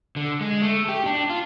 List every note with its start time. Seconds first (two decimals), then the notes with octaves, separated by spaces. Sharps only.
0.16 D3
0.41 G#3
0.62 A3
0.89 G4
1.06 D4
1.30 F4